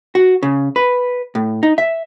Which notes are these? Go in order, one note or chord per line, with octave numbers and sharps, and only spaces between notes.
F#4
C#3
B4
A2
D#4
E5